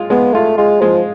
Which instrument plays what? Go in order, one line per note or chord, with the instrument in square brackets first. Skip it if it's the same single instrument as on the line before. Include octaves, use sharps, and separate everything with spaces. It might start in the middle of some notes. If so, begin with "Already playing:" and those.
Already playing: [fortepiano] G#3 F4
[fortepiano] G#3 [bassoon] B3
[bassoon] A3 [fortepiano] F4
[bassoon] G#3 [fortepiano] F4
[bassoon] F3 [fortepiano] G#3